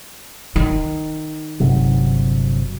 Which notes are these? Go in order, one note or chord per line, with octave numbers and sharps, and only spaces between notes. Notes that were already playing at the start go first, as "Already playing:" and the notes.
D#3
G1 C3 F#3